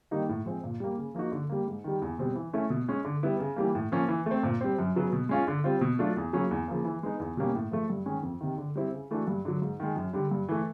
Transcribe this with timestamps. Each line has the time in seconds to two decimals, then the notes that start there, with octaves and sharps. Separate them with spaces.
0.11 D#3 G3 A#3 D#4
0.29 A2
0.46 F3 G#3 C4
0.64 A#2
0.80 G3 A#3
0.97 C#3
1.14 F3 A#3 D#4 F#4
1.32 D3
1.50 G3 A#3
1.67 G#2
1.84 D#3 G3
2.02 E2
2.19 B2 G3 C4
2.35 E3
2.53 A3 C#4 E4
2.70 B2
2.88 G#3 C#4
3.05 D3
3.23 G3 B3 E4
3.39 C#3
3.56 E3 G3 A#3
3.75 A2
3.92 F3 A#3 C#4
4.08 E3
4.26 A3 C4
4.43 A#2
4.61 G3 C4
4.79 F#2
4.95 C#3 F#3 B3
5.12 B2
5.29 G#3 C#4 F4
5.47 D3
5.64 G3 C4 F4
5.81 B2
5.99 F#3 A3 D4 F4
6.17 E2
6.33 C#3 F#3 A#3 C#4
6.51 E2
6.68 C#3 F3 A#3
6.85 E3
7.03 G#3 B3 D#4
7.20 E2
7.37 B2 G3 A#3 C#4
7.55 A2
7.71 F3 A3
7.90 G2
8.06 D#3 G#3 C#4
8.23 F2
8.41 C3 D#3
8.58 D3
8.76 G3 C4 E4
8.92 C#3
9.11 E3 A3 D4 F#4
9.27 G2
9.45 D3 F#3
9.62 G#2
9.80 D#3 G#3
9.96 F#2
10.13 D3 G3
10.31 G2
10.49 E3 A3